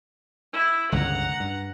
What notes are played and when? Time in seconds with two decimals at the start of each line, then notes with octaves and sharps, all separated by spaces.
0.54 E4
0.92 G1 C#2 C#3 F#5 A#5
1.40 G2